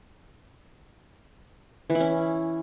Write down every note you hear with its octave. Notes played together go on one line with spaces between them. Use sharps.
E3
E4
C#4